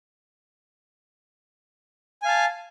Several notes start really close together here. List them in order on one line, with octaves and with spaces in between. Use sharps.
G#5 F5 A5